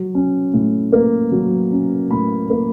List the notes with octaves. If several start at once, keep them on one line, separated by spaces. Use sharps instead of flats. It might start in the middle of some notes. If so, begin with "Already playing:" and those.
Already playing: F#3
C#4
A2
A#3
F#3
C#4
A2 B5
A#3